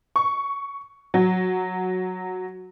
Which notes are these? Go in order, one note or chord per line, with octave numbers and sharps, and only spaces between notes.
C#6
F#3